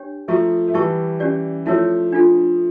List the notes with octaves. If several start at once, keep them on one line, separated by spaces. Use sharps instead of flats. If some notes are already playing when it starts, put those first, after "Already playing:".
Already playing: D4 G4 C#5 G5
F3 A3 A4 E5 A#5 C#6
A3
E3 G3 A#4 E5 A5 C#6
C#4 G4 D5
F3 A3 E4 A#4 C#5
D4 F4 A4